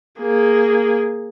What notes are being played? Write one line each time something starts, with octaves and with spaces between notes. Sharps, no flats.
A#3 G#4